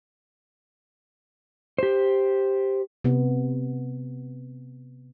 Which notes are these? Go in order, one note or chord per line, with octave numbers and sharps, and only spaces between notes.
G4 C5
C3 B3